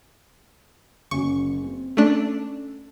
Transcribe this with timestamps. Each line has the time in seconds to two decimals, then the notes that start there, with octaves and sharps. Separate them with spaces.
1.11 F#1 C#4 F#4 C#6
1.64 C4
1.97 A3 C#4 D4 A4